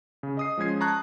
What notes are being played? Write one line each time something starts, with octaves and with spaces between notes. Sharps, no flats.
C#3
D#5 D#6 C7
F3 G#3 C#4 G#6 C7
A5 A#5 C#6 F#6 G#6